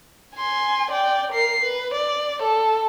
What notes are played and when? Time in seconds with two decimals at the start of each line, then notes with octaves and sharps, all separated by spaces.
0.36 G#5 C6
0.91 D5 G5
1.32 A#4 C7
1.63 B4
1.94 D5
2.42 A4